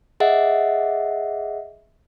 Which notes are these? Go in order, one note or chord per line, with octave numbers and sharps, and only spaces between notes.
G#4 D#5 E5 F#5